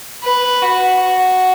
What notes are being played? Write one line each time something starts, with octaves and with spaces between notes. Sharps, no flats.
B4
F#4
F#4